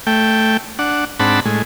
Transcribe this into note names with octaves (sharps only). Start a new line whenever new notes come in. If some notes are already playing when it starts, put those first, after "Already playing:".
A3 G5
D4 F#5
G#2 C4 D4 F#5 A5 B5
A2 G#3